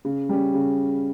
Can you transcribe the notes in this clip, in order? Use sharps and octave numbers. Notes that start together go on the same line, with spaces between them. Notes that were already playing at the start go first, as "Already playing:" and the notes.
C#3
G3 C#4
C#3